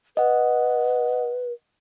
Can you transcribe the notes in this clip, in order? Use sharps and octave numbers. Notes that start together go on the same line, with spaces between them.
B4 D#5 F#5